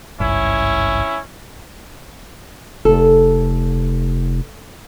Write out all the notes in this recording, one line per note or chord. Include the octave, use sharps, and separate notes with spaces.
G#1 C#2 G2 C#4 E4
F1 A4